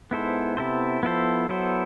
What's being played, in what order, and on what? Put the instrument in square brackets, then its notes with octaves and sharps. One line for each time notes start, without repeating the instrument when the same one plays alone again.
[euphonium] G#2 [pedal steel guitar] B3 E4 A4 C5
[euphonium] C3 [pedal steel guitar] B3 E4 A4 C5
[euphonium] F3 [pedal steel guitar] B3 E4 A4 C5
[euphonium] F#3 [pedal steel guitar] B3 E4 A4 C5